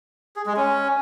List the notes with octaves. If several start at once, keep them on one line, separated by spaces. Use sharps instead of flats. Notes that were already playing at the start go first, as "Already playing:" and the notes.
G#4
G#3
C#4